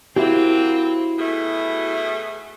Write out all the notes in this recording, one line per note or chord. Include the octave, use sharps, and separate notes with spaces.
F#3 A#3 C4 E4 F#4 G4
B2 A3 G#4